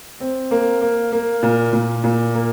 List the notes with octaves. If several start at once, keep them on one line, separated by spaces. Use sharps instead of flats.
C4
A#3
A#3
A#3
A#2
A#2
A#2
A#3